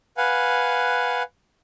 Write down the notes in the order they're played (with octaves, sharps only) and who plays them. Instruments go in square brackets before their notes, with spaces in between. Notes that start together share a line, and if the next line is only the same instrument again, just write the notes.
[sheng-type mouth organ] B4 F5 F#5 G#5